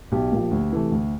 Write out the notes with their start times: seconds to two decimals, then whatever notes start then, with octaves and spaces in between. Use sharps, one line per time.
0.12 B1 G4
0.32 A#2 F3
0.51 D2
0.72 C3 E3 A3
0.92 D2